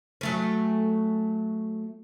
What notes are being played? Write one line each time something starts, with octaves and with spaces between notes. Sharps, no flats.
F#3 A3 C#4